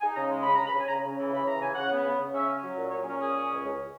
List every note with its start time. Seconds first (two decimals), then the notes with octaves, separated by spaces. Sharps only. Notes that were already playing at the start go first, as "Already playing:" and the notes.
0.01 D#4 G#5
0.15 C#3 A#5
0.30 G#3
0.42 C#3 B5
0.54 C#3 A#5
0.66 B5
0.74 C#3
0.79 G#5
0.87 C#3 A#5
1.03 C#3
1.17 E3
1.31 C#3 B5
1.46 E3 A#5
1.60 C#3 G#5
1.75 C#3 F#5
1.90 B3
2.03 C#3
2.18 C#3
2.33 C#4 E5
2.47 C#4
2.61 F#3
2.76 A#2
2.91 A#2 C#5
3.00 G#4
3.05 C#4 A#4
3.20 A#2 G#4
3.34 C#4
3.49 C#2
3.63 C#2